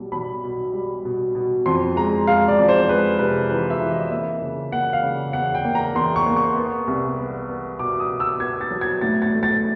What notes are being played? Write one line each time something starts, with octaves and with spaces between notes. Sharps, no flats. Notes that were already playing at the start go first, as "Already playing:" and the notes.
Already playing: B1 G3
B1 B5
B2
G3
B2
B2
F2 C6
G#3 A#5
G#3 F5
D5
F2
C5
G#3 B4
C3 B4
E3 B4
E5
E3
D#5
A#3 E5
C#3
A#3 F#5
F5
C#3
E2 F#5
G5
A#3
A#5
E2 C6
C#6
A#3
C#6
B3
C2
B3
B3
B2 D6
D#6
B2
E6
B3 G#6
A6
F#3
G#6
A2 A6
A6
A3
A6